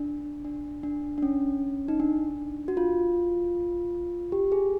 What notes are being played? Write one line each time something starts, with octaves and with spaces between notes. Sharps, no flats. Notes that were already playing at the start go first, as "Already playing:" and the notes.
Already playing: D4
D4
D4
D4
C#4
D#4
D4
F#4
F4
G4
G#4